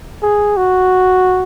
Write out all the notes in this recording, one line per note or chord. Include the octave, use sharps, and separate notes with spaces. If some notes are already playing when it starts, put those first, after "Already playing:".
G#4
F#4